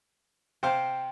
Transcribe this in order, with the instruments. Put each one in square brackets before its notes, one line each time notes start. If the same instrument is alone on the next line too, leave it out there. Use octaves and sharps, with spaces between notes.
[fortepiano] C3 C5 F5 [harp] G5